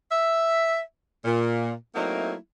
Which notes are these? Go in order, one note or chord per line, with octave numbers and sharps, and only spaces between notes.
E5
A#2
F#3 A3 A#3 C4 D#4 E4